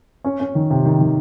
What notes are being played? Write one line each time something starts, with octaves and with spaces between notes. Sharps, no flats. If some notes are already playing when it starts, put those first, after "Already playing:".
C#4
C#4
D#3
C3
D#3
D#3